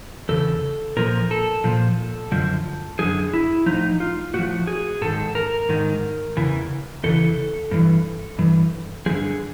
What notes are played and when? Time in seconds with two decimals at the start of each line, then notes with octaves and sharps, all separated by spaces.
0.29 E2 C#3 A4
0.97 A#2 F3 A#4
1.31 A4
1.64 A#2 F3
2.32 F#2 D3 F3
2.99 F#2 D3 F3 G#4
3.33 E4
3.66 A2 F3 D#4
4.00 F4
4.34 A2 F3 F#4
4.67 G#4
5.01 G#2 D#3 A4
5.35 A#4
5.69 G#2 D#3
6.37 E2 C#3 E3
7.04 E2 C#3 E3 A4
7.71 G2 E3
8.39 G2 E3
9.06 G2 D3 F3 G#4